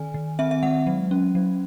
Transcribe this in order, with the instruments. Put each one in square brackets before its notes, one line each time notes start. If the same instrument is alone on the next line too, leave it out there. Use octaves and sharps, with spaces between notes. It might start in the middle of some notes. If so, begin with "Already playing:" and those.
Already playing: [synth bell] D#3 G#5
D#3
C4 E5
E5
G#3 F#5
F#3
C#4
F#3